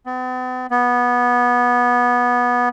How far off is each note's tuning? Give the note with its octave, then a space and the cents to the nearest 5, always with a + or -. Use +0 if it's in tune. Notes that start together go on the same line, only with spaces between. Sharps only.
B3 +45
B3 -15